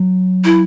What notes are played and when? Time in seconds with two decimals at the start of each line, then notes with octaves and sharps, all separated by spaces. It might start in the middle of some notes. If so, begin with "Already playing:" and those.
Already playing: F#3
0.45 E4